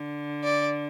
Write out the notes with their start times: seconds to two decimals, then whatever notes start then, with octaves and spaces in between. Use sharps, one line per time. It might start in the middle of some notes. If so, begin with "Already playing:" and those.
Already playing: D3
0.43 D5